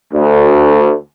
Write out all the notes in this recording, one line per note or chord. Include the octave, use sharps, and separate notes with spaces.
D2